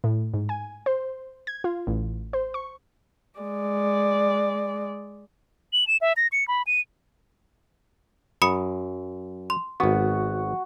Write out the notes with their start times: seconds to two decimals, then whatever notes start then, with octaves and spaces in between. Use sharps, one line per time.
0.04 A2
0.34 G#2
0.49 G#5
0.86 C5
1.47 G#6
1.64 F4
1.87 A1
2.33 C5
2.54 C#6
3.40 G#3 D5
5.73 F#7
5.87 E7
6.01 E5
6.17 A#6
6.32 C#7
6.48 B5
6.67 D#7
8.42 F#2 B5 D#6 C#7
9.50 C6
9.80 G#1 B3 F#4